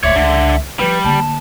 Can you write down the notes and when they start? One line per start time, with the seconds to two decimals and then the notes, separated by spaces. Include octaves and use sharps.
0.03 D1 C#5 D5 E5
0.15 C#2 D3 D#4
0.79 F3 G3 B4
1.04 D3 A#3 A5